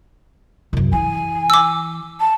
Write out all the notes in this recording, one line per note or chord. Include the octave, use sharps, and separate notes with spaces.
C2 F#2
E3 G#5
D6 E6
A5